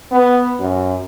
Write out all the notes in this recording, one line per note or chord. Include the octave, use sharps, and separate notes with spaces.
B3
F#2